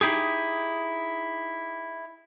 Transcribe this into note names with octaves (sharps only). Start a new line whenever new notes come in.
D#4 E4 G4 G#4